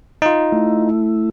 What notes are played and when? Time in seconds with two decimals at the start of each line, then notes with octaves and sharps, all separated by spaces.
0.22 D#4 F4
0.52 A3 E4